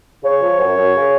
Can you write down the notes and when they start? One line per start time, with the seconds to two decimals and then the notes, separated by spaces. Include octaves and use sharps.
0.24 C#3 C#5
0.42 F3
0.59 F#2
0.77 F#2
0.95 C#3